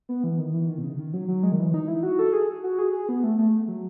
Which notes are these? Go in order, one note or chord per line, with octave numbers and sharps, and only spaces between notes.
B3
E3
D#3
E3
D#3
B2
C#3
D#3
F#3
F#3
G#3
D#3
E3
D#4
E4
F#4
A4
G#4
F#4
G#4
G#4
B3
A3
A3
F#3